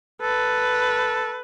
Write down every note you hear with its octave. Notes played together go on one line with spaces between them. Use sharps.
A4 B4